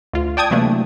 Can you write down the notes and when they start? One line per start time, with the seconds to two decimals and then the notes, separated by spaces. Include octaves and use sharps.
0.13 D2 F4
0.37 D5 G5 A5 D#6 G#6
0.51 C3 E3 F#3 A3 A#3 D4